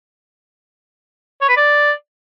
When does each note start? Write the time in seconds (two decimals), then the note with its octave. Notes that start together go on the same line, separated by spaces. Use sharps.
1.41 C#5
1.49 B4
1.57 D5